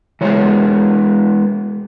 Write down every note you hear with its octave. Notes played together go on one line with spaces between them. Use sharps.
E3 G#3 B3 C#5